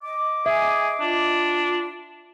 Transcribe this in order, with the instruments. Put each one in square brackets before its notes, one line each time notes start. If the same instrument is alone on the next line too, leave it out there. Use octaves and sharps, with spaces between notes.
[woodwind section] D#5 D6
[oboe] G#4 [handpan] E5 [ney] G#5
[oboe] D4 [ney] F4